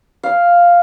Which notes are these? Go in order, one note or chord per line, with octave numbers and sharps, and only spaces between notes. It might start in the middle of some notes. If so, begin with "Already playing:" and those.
F5